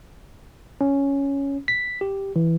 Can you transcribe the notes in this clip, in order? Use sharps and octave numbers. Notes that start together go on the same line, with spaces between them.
C#4
B6
G4
E3